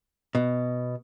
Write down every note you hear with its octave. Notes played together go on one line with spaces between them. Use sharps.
B2